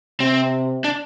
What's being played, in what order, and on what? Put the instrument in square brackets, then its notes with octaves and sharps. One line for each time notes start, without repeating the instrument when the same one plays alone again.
[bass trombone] C3 [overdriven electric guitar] C4
[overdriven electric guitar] D4